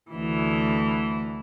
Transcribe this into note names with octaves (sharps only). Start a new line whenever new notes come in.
D2 E3